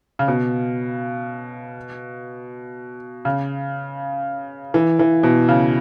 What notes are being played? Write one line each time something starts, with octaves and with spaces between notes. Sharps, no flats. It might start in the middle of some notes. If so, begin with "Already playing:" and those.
C#3
B2
C#3
E3
E3
B2
C#3